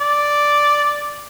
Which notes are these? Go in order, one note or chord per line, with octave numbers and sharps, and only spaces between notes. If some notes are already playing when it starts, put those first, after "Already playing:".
D5